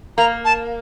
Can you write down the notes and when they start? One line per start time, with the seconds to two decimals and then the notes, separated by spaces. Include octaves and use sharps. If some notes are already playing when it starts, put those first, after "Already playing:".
0.18 A#3 A#5
0.45 A5